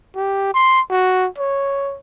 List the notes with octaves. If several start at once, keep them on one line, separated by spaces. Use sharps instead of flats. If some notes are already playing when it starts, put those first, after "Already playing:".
G4
C6
F#4
C#5